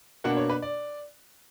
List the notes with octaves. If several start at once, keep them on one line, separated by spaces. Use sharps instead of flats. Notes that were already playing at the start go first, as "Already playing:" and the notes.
B2 A#3 D4 F#5
C#5
B4
D5